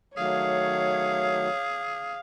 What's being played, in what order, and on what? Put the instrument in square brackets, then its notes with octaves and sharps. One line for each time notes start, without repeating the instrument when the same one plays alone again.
[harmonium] D#3 F#3 A3 [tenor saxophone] G#4 [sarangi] C#5 [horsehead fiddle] F5